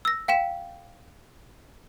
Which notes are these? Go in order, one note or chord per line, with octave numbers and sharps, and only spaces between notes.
E6 A#6
F5 G5 B6 E7